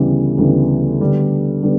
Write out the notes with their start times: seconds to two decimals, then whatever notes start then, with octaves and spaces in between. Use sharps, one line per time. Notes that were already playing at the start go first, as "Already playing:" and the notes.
Already playing: D2 C#3 E3 G3 B3
0.38 D2 C#3 E3 G3 B3
1.00 D2 D3 G3 B3
1.63 D3 G3 B3